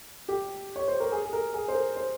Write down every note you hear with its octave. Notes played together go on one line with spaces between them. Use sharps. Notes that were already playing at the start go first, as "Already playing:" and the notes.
G4
C#5
C5
A#4
G#4
G#4
A#4
G#4
C5
A#4
C5